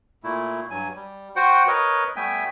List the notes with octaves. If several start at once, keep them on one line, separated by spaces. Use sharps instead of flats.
A#2 A3 E4
G2 F#3 G#5
G3
F#4 C5 F#5 G5
A#4 B4 C#5 D#5
G3 A3 B3 E5 G5 G#5